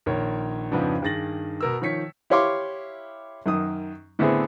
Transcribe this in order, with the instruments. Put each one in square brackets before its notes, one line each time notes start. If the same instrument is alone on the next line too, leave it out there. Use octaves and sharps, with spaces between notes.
[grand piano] A#1 D#3 A#4 C#5
F2 G#2 C#3 F3 B3 D4
G2 D#3 G#4 A6 A#6 F#7
B2 A#4 E6
D#3 F3 C#5 B6 C#7
[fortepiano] E4 G4 C#5 F5 C6 D6
F#2 D#3 D#6
A2 D3 B3 C4 E4 G#4